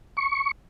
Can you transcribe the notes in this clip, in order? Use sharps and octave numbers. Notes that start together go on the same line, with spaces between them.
C#6